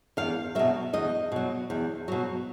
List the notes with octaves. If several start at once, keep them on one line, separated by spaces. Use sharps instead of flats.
E2 F5
B2 F#3 E5
E2 D#5
B2 F#3
E2
B2 F#3